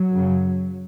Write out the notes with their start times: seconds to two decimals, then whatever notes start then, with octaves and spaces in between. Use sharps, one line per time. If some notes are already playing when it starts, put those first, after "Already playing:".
Already playing: F#3
0.11 F#2 C#3